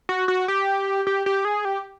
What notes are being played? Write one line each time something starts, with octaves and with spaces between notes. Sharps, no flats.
F#4
F#4
G4
G4
G4
G#4
G4